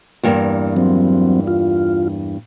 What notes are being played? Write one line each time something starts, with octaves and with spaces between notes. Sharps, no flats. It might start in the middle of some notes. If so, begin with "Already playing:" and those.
E2 G2 A#3
F#3 C4
F4